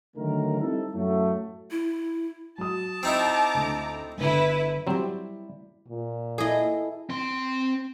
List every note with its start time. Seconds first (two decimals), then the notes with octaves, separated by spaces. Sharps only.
0.16 D3 D#3 F#3 A3 A#4
0.59 G3 C4 D#4 E4 A4
0.93 F#2 A2 F#3 A3
1.71 E4
2.58 F#3 A5 D#6
3.03 C4 D#4 E4 A#5 D6
3.54 D2
4.18 G1 D3 E4 B4
4.87 F#3 G3 C4 E4
5.88 A#2
6.38 E4 G#4 A4 D#5
7.10 C4 C6